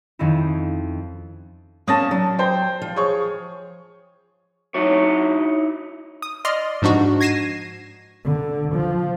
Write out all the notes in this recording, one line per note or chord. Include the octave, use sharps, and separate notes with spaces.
F2 D#3 C#4 D#4 E4
A#3 C#4 A5 D#6 A6 A#6
F#3
C5 G5
F3
G#4 C#5 C#6
F#3 D#4 E4 C#5
D#6
D5 D#5 C6 F6
G#2 F3 D4 D#4 F#4
G#6 A#6 C7 D#7 E7
D3
F3